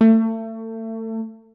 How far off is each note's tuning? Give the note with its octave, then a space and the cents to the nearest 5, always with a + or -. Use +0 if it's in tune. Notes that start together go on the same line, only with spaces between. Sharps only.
A3 +30